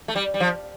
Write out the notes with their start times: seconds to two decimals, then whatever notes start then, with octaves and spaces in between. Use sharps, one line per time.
0.08 A3
0.16 G3
0.34 G3
0.40 F3